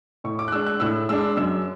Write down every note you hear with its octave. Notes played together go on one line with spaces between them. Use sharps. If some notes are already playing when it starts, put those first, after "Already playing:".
A2 C#6
D6
F#6
G#3 D4 E6
F#6
A2 E6
G#3 D4 E6
F#2 E6